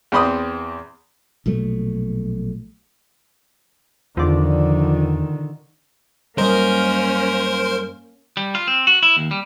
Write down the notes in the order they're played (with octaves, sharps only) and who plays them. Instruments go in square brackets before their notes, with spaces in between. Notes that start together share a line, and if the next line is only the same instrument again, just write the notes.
[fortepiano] E2 C4 B5 C6 D#6
[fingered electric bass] A#1 B2 F#3 A3
[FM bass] E2 [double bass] D3 D#3 [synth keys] F3 D5
[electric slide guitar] F#2 G3 D#5 [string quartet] A#3 C#4 [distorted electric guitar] A#4 [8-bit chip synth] C5
[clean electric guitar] G3
F4
C4
F#4
E4
D#2
G3